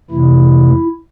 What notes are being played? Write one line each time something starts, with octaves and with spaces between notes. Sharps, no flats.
F2 C3 E3 A3 E4